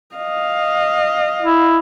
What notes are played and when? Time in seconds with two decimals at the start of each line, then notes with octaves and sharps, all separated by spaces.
0.16 D#5 F5
1.42 E4